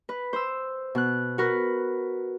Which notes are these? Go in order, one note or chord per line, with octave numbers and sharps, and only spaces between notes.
B4
C5 E6
B2 F#6
F#4 A#4 B4